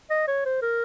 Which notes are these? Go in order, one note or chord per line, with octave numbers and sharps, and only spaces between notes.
D#5
C#5
C5
A#4